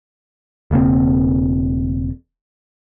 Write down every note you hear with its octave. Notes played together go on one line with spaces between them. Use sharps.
E1 C#3 A#3 C4